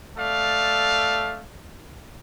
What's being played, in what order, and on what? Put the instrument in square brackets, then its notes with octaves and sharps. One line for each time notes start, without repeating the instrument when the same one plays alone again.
[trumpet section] A3 A4 D5 F5